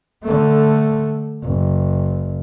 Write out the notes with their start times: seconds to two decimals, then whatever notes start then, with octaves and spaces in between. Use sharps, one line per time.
0.23 D3 A3
1.43 F#1